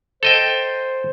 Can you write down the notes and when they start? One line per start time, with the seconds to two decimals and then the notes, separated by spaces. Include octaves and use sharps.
0.23 A4 C5 D#5 G5